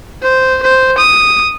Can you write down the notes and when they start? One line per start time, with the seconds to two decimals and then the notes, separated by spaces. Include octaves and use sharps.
0.22 C5
0.63 C5
0.98 D#6